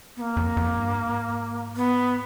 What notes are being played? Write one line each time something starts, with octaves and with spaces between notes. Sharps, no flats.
B3
A#3
F2
F2
G2
G#2
B3